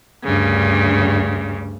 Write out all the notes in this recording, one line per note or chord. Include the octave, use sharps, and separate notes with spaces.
D2 G2 C#3